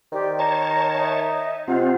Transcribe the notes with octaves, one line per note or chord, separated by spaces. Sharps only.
D#3 G4 C5 D5
C#5 A5 A#5
D#4 E5
C3 C4 F4 F#5